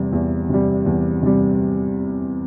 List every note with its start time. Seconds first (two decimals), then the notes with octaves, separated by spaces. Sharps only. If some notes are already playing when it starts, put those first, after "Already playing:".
Already playing: E2 C3 G3
0.12 E2
0.49 C3 G3
0.86 E2
1.22 C3 G3